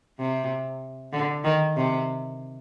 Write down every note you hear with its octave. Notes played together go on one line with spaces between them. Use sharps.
C3
D3
D#3
C3